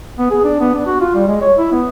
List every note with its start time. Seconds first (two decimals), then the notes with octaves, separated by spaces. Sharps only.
0.19 B3
0.31 G#4
0.44 D4
0.60 B3
0.74 D4
0.87 F#4
1.01 F4
1.15 G3
1.27 G#3
1.41 C#5
1.58 E4
1.72 B3